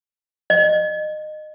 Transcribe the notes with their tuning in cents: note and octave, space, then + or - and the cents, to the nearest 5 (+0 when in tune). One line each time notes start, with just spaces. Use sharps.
D#5 -25